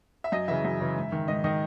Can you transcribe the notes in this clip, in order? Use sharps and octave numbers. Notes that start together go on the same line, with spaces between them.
E5
F#2 D#5
C#3 E3 E5
F#2
C#3 E3
G#2
D#3
G#2 D#5
D#3 D#5